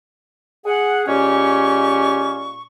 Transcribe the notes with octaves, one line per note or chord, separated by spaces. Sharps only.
G#4 F#5
A#2 G#3 C#4 G4 C#5 C#6